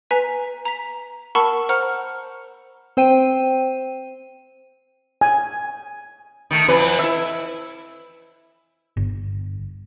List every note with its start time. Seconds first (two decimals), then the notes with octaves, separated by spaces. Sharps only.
0.11 B4 G#5 A#5 B6
0.65 A#5 B6
1.35 A#4 F#5 A5 B5 C#6 E6
1.69 C5 F#5 A#5 C#6 F6
2.97 C4 C5 G5 D#7
5.21 G#5
6.51 D#3 A3
6.68 F2 E3 B4
6.99 E4 E5
8.97 G1